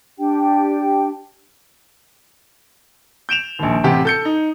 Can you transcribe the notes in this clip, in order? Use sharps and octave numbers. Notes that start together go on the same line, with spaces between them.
D4 G4 G5
G6 D7 E7 F7
A#1 D#2
A1 C3 G4 F#5
A4 G6 C#7
D#4